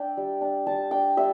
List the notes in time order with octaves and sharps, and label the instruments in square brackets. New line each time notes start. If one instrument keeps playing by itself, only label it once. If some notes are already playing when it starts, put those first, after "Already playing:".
Already playing: [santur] D4 E5 G5
G3
D4
G3 A5
D4 G5
G3 E5